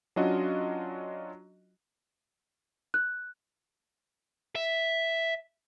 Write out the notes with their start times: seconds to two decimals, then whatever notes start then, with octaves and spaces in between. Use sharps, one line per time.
0.16 F#3 C#4 D4 F4 F#4 D#5
2.94 F#6
4.55 E5